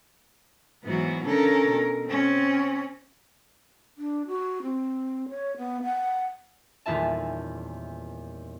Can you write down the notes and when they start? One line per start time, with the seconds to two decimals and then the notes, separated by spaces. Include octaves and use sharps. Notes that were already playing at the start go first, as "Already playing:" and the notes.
0.84 G#2 E3 F#3 B3 F#4
1.25 C#3 C#4 D4 A4 A#4
1.69 B2
2.06 C4 C#4
3.98 D4
4.27 F#4
4.62 C4
5.29 C#5
5.57 B3
5.83 F#5
6.86 D#1 E2 F4 E5 A5